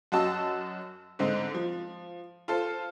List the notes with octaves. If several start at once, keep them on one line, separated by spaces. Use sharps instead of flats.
F#2 F#4 D#5 A5 E6
G#2 D3 C4 D#4
F3
F4 A4 C5